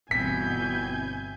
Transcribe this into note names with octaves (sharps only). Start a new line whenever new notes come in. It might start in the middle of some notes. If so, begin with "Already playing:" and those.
G1 B2 E3 C4 G#5 G6 B6